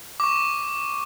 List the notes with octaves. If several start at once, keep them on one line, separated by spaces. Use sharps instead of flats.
C#6 D6